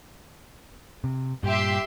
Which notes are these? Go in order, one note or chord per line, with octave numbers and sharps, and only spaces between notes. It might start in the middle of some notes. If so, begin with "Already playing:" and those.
C3
G2 A#2 G4 E5 C6